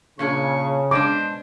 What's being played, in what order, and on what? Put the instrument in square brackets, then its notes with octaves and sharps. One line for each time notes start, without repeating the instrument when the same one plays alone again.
[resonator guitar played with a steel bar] A#2 C#4 D4 [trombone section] C#3 [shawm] C#6
[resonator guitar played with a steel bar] B2 G#3 D4 [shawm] C5 [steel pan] D6